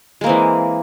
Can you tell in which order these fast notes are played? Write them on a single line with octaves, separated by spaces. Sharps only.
G#3 A#3 C4 E3